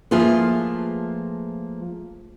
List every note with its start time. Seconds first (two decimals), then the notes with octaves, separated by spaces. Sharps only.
0.11 F3 A3 A#3 F4 G#4 B4